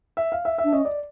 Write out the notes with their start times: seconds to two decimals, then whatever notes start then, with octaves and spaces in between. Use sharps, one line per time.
0.17 E5
0.32 F5
0.45 E5
0.58 E5
0.64 D4
0.73 C#4 D#5
0.85 D5